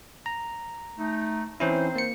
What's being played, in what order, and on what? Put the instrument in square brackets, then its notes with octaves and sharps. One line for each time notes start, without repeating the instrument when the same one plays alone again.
[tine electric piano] A#5
[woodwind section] A3 D#4
[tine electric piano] E3 C#4 E4 [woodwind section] C4 D#4 C5
[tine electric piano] A#3 C#7